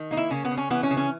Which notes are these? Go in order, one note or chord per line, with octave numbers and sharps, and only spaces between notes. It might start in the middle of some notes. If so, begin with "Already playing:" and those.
Already playing: D#3
A#3 D#4
E4
C#3 C#4
B3
C#3
C#4
E3 B3
C#4
C#3
C#4